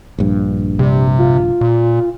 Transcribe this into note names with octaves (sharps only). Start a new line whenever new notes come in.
A#1 G2
C3 G3
F4
A#2